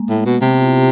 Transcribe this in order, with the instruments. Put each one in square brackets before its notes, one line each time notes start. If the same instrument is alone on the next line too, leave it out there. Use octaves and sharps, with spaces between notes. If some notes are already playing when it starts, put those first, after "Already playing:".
Already playing: [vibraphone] G#3 A#3
[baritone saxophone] A2
B2
[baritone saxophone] C3 [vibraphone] B3
[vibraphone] F4
E4
G4